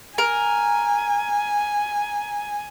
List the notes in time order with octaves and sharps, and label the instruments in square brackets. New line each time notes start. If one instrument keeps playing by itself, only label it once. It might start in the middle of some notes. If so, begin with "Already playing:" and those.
[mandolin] A#4 [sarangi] G#5